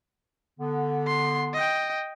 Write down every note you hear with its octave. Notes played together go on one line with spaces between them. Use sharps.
D3 B3
C6
D#5 G5